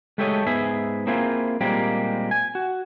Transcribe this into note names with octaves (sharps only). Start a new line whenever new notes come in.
G#3 A3 G4 A4 C#5 D#5
G#2 B3 G#4 E5
A#3 C4 E4 F4 G#4
A#2 G3 G#3 A#3 C4 G4
G#5
F#4